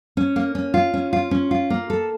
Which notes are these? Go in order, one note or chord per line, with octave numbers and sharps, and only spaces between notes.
C#4
A#3
C#4
F4
C#4
F4
C#4
F4
A#3
A4